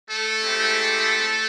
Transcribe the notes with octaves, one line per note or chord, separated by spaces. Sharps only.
A3 A4
G#3 C4 E4 G4